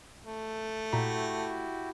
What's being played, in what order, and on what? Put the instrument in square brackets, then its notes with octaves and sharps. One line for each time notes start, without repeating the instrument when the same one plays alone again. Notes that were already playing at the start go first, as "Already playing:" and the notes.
[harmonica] A3
[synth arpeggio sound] A#2 A#5 B6 [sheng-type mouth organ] E4 F#4 G4